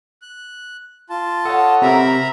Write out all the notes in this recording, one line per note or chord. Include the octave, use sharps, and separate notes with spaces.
F#6
F4 A5
A4 C#5 D#5 F#5
C3 A#4 E5 A#5 B5